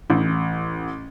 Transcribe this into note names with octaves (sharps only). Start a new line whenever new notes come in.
A1